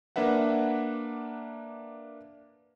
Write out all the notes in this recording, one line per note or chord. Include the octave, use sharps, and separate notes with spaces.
A#3 D4 B4 E5 F#5